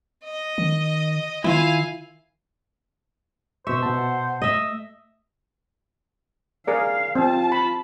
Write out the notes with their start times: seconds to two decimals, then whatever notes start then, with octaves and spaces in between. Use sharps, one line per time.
0.24 D#5
0.58 D#3
1.44 D#3 E4 F4 F5 G#5
3.67 B2 C5 E5 C#6
3.83 B2 F#5 A5
4.42 A3 D#5 E5
6.67 G#4 A#4 D5 F5
7.15 C4 F4 A5
7.52 B5